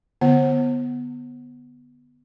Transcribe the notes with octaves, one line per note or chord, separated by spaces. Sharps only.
D3 B3 F#5